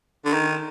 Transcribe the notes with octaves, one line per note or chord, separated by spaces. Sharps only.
D3
D#3